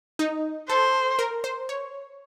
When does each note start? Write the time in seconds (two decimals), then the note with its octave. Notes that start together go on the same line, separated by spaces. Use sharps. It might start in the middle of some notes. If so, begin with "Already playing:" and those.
0.19 D#4
0.70 A4 C5
1.19 A#4
1.44 C5
1.69 C#5